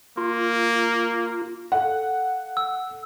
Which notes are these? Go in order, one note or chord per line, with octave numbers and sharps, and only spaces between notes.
A#3 F4
A4 F5 F#5
E6